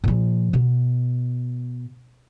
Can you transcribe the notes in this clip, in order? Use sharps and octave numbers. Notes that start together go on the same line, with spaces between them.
A#2 F3
B2